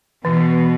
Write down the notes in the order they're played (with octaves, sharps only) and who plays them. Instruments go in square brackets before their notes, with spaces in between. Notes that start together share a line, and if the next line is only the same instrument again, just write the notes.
[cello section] B2 [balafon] E3